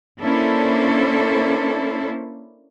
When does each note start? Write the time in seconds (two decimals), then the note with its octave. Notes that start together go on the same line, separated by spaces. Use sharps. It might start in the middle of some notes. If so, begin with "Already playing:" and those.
0.20 A#3 C#4 D4 E4 A4 C5